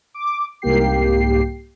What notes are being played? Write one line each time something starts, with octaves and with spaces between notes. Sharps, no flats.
D6
C2 G#2 A#3 G4 G5 C7